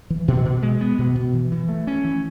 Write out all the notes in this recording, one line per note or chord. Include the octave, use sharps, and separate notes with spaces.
E3
B2
B2
G#3
B3
B2
B2
E3
E3
A3
C#4
E3